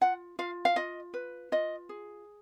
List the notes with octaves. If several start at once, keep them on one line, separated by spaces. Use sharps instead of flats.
F4 F#5
F4 F5
F5
F4 D#5
B4
F4 D#5
G#4